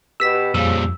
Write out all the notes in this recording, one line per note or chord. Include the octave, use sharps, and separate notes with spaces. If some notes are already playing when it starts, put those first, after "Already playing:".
B2 G4 B4 E6 B6 E7
F2 A#2 C#3 F3 G3 E6